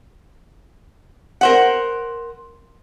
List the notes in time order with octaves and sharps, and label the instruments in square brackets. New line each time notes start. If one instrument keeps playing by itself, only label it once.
[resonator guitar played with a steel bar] A#4 C5 F#5